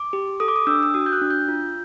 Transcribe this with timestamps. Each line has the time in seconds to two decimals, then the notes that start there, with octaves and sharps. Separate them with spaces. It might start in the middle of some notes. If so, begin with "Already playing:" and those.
Already playing: D6
0.13 G4
0.40 A4 D#6
0.48 D6
0.56 D#6
0.67 D4 E6
0.83 E6
0.94 F#4 D#6
1.06 G6
1.12 F#6
1.22 D4
1.30 G6
1.48 F4